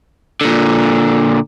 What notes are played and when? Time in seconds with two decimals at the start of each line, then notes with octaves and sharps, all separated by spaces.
0.41 A#2 D3